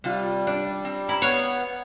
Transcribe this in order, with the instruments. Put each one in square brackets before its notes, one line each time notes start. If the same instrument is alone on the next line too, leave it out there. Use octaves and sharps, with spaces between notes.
[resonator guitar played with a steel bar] C3 F4 [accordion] G3
[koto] D4
[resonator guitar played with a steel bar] C4
[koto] E4 [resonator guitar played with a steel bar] A#5
[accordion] B3 [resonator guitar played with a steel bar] B4 [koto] C#5 F5